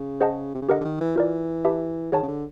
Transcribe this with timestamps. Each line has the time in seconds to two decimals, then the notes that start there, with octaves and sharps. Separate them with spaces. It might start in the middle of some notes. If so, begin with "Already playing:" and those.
Already playing: C#3
0.21 G#4 C5 D#5 F#5 A5
0.54 C3
0.61 C#3
0.69 D3 G4 A#4 D#5 F#5
0.81 D3
0.85 D#3
1.01 E3
1.16 E3 F4 A#4 D5
1.65 G4 B4 E5 A5
2.12 D#3 G#4 C#5 F#5 A5
2.22 C#3
2.28 D3